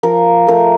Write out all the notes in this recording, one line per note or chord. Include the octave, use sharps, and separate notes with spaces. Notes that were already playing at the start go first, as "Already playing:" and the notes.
F3 A#4
A3 A#4